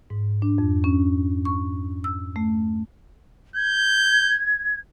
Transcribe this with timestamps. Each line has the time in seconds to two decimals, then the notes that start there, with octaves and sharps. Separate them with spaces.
0.10 G#2
0.42 D4
0.58 F2
0.84 C#4
1.45 C#6
2.04 E6
2.36 A3
3.56 G6 G#6